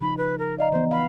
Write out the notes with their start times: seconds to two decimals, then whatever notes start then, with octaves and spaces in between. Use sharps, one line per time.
0.01 C#3 F3 D#4 B5
0.17 B4
0.38 A#4
0.58 D5 D#5 F5 A#5
0.72 E3 B3 C5
0.91 F5 B5